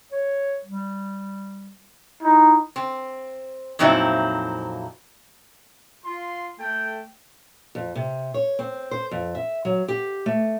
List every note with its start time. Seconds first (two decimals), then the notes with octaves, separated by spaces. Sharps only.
0.12 C#5
0.65 G3
2.23 D#4 E4
2.76 C4
3.79 F2 A#2 F#3 C4 D#4 E4
6.05 F4 C6
6.60 A3 G5
7.75 F2
7.96 C3
8.34 C#5
8.59 C4
8.91 C5
9.11 F2
9.35 E5
9.65 F#3
9.88 G4
10.26 A3